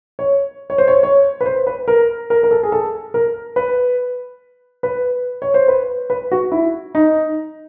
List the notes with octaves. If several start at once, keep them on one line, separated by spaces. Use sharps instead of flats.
C#5
C#5
C5
C#5
C#5
B4
C5
B4
A#4
A#4
A#4
A4
G#4
A4
A#4
B4
B4
C#5
C5
B4
B4
F#4
E4
D#4